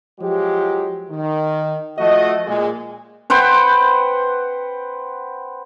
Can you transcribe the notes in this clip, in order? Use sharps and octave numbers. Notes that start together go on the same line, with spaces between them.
F3 F#3 G#3 G4
D#3
F3 A3 F#4 D#5
A#2 G#3
B4 C5 F#5 G5